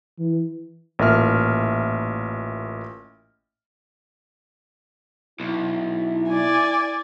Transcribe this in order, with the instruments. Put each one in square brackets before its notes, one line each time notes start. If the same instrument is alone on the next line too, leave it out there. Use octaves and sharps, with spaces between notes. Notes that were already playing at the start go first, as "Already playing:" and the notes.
[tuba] E3
[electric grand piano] A1 A#2 A#3 E5 F6
[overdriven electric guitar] B1 [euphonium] E4
[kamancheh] D5 G#5